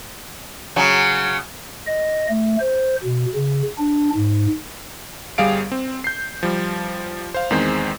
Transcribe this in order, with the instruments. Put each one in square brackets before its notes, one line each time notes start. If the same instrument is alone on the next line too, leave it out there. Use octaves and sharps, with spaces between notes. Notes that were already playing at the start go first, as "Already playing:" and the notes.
[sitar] C#3 F#3
[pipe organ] D#5
A3
C5
B2
C#3
D4
G#2
[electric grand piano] G1 G3 G#4 F5 D7
C4
G6 C7
F3 G3
C5 F5
E2 D#3 G#3 C4 C5